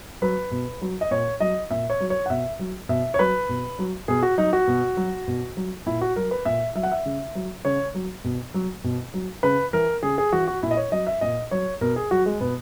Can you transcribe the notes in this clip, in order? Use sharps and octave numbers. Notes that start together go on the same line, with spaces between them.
F#3 B4
B2
F#3
D#5
A#2 C#5
F#3 D#5
A#2 E5
C#5
F#3
C#5
F#5
B2 E5
F#3
B2 E5
C#5
F#3 B4
B2
F#3
B2 G#4
F#4
F#3 D#4
F#4
B2
F#3
B2
F#3
A#2 E4
F#4
F#3 A#4
B4
A#2 E5
F#3 E5
F#5
E5
C#3
F#3
C#3 C#5
F#3
B2
F#3
B2
F#3
C#3 B4
E3 A#4
C#3 G#4
G#4
E3 F#4
F#4
A#2 E4
D#5
C#5
F#3 D#5
E5
A#2 D#5
F#3 C#5
B2 A#4
G#4
F#3 F#4
G#3
B2 B3